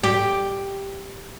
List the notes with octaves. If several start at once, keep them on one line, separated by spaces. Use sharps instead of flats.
G4